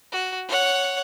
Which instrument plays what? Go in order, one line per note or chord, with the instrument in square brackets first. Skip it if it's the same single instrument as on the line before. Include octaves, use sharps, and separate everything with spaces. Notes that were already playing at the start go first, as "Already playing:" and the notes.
[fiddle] F#4
C#5 F#5